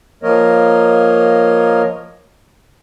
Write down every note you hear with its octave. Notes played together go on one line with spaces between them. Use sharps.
F3 A#3 A#4 C#5 D#5